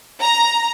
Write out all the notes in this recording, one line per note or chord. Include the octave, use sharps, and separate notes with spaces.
A#5